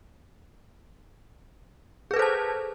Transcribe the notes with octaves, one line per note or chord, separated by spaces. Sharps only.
G#4 A4 B4 C5 A5